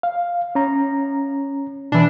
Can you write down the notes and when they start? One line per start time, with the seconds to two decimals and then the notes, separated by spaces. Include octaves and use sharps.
0.03 F5
0.55 C#4 A#5
1.92 B2 E3 D4